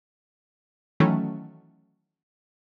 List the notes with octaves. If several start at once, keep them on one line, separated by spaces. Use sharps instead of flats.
D#3 E3 F#3 A3 C#4